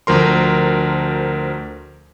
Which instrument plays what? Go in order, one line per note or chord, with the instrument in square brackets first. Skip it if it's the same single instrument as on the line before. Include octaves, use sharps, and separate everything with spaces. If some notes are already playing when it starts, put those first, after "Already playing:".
[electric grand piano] D2 F3 A#4 C6